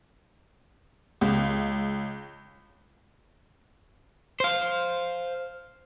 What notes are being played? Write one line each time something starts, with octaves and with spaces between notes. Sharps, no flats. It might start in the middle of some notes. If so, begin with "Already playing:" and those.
C#2
C5 F5